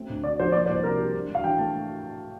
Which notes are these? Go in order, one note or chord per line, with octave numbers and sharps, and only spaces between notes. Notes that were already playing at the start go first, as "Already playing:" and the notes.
Already playing: A3 C4
D2
D3 D5
F3 C5
A#3 D5
C5
C2
C3 A#4
G3
D4
G2
F5
E3 G5
A3 A5